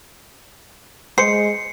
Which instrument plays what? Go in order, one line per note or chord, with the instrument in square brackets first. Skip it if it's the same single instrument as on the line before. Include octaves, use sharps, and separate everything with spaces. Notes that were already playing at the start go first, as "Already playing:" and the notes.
[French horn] G#3 [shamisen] G#4 C5 [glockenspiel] C7 C#7